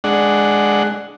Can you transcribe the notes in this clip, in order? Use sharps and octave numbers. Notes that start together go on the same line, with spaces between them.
G#3 D4 F#5